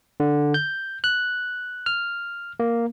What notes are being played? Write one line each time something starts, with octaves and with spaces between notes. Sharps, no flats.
D3
G6
F#6
F6
A#3